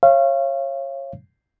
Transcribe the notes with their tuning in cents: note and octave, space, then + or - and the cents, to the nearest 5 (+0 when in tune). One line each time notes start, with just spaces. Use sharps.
C#5 -25 F5 -30